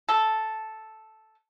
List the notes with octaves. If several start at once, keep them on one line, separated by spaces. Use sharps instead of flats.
A4